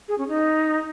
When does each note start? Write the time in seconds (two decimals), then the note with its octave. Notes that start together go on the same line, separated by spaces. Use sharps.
0.08 G#4
0.18 C#4
0.28 D#4